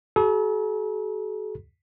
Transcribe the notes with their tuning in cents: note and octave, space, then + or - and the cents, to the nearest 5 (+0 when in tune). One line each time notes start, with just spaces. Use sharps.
F#4 +45 A4 -40 A#5 +40